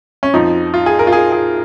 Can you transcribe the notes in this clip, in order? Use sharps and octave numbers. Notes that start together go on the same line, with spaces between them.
C#4
F2 F3 D#4
F4
G#4
A#4
F4
G#4
G#4